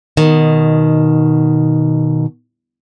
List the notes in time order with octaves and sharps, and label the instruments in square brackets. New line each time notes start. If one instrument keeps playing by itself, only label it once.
[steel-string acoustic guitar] B2 D#3